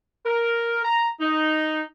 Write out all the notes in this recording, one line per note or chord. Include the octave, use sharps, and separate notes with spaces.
A#4
A#5
D#4